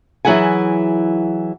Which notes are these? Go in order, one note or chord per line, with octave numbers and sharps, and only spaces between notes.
E3 F#3 E4 G#4 F#5 G#5